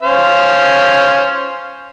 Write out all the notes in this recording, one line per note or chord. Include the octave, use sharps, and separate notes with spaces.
C#4 C5 F5